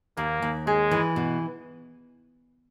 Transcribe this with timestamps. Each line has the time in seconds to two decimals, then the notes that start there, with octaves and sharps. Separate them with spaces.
0.17 D#2 A#3
0.42 D#2
0.67 G#3 G#4
0.91 E3
1.16 B2